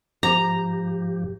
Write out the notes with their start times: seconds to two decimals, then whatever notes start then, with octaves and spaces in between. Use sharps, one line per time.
0.23 G#2 F3 G4 A#5